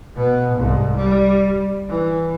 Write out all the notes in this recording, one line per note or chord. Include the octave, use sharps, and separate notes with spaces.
B2 B3
C2 G#2
G3
E3